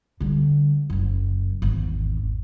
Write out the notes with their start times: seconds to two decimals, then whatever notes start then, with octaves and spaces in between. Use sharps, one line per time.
0.20 D3 G3
0.90 F#1 F#2
1.62 G#1 E2